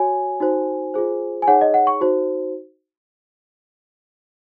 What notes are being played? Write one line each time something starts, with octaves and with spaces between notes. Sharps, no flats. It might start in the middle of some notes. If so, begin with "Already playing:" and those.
Already playing: F#4 C#5 G#5
D#4 F#4 C5
F4 G#4 C5
G#5
D#4 G#4 C#5 F#5
D#5
F#5
C#6
D#4 F#4 C5